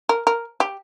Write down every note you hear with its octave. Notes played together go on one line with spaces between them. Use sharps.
A#4
A#4
G4